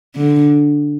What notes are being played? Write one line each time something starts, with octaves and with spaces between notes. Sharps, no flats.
D3